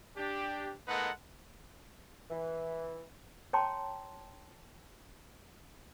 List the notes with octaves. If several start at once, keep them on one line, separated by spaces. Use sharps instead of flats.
D4 G4
G#3 A#3 D#4 A4 B4 F#5
E3
C#5 G5 A5 A#5 C6 D6